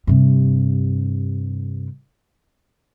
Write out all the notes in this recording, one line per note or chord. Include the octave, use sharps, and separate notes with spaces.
G2 C3